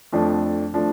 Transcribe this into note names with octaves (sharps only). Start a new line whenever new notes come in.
F2 F3 A3 D4
F3 A3 D4